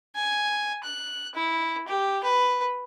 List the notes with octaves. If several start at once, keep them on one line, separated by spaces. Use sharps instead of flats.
G#5
F#6
E4
G4
B4